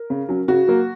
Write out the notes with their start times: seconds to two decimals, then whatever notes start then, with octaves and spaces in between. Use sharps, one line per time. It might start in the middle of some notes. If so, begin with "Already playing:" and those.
Already playing: A#4
0.10 C#3
0.29 F#3 C#4
0.48 C#3 F#4
0.67 F#3 A#3